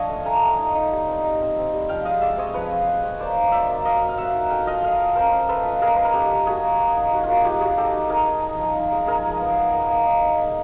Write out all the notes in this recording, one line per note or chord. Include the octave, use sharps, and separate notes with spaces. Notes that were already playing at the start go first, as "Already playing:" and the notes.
Already playing: F3 D4 F4 C#5 D#5
A3
A3 G#5 A#5
A3
D#4
D#4
G3
C4
D#4
C4
C4
G3
F3 F5 G5
G#3 D#5 F5
G#3 D5 E5
C4 C#5 D#5
F3 B4 C#5
C4
G#3
C4
A#3 C5 D5
D#4
F#3 D5 E5
A#3
A#3 D#5 F5
F#3
F5
F#3 E5 F#5
D#4
A3 F5 G5
F4 D#5 F5
A3 D#5 F5
F4
C#4 A#4 C5
F4
A3 A4 B4
F4
A#3 G#4 A#4
A#3 B4
A#4
D#4 G4 A4
D#4
A#3 F#4 G#4
A#3
A#3
D#4
D#4 F#4
F4
A#3 F#4
D#4 F4 G4
A#3 F#4 G#4
D#4 G4 A4
D#4
D#4 G#4 A#4
D#4
D#4
F3
D#4
G#3
G#3 G#4 A#4
F3
B3
B3
A#3
A#3
D#4
D#4
A#3